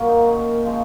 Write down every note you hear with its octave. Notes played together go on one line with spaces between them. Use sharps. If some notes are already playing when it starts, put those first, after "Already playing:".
Already playing: A#2 F#3 A#3 A#4 C#5
D#4
A#2 C#4
F3 G#3